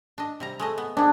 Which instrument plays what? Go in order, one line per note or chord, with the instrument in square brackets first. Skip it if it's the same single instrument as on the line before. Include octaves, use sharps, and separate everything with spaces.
[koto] D4 D#5
C3 G3 A#5
G#3 A3 D#5
B3
[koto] B3 G#4 [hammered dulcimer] D4